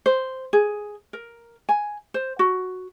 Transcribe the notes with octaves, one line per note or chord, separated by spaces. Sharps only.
C5
G#4
A#4
G#5
C5
F#4